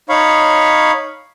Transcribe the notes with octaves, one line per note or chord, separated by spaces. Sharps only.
D#4 C#5 F5 B5 C#6